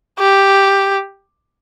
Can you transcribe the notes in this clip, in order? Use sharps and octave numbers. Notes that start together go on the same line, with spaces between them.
G4